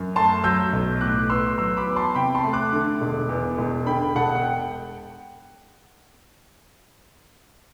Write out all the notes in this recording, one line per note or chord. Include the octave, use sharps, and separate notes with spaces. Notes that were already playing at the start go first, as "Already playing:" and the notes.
Already playing: F#2
A3 A5 C6
F#3 E6 G6
B1
A2 D6 F#6
B3 C6 E6
F#3 C6 E6
B5 D6
E2
A5 C6
C3 G5 B5
A5 C6
A3
D6 F#6
D3
E1
E2
E1
D3 G5 B5
E1 F#5 A5
F#5
G5